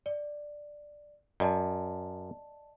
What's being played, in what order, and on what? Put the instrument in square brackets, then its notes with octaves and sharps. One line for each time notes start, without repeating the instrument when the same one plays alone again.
[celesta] D5
[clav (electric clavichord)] F#2 [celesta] D5 D#5 A5